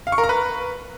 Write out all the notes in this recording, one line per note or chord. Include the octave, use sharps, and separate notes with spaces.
F5
C#6
A#4
A#5
B4